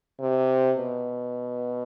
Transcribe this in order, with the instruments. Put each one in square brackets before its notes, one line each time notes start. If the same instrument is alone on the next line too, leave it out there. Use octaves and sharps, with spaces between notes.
[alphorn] C3
B2